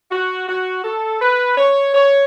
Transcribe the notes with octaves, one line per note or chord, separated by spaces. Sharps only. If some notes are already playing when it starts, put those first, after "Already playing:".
F#4
F#4
A4
B4
C#5
C#5